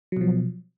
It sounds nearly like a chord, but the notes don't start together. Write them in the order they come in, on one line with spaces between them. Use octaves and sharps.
F#3 B2 F3